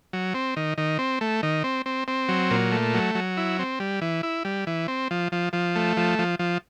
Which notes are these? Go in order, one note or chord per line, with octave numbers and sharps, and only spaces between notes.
F#3
C4
D#3
D#3
C4
A3
D#3
C4
C4
C4
F#3
A#2
A3
F#3
F#3
E4
C4
G3
E3
E4
G3
E3
C4
F3
F3
F3
A3
F3
F3
F3